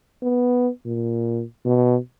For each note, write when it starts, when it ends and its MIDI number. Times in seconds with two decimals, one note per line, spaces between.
0.22 0.68 59
0.86 1.42 46
1.65 1.97 47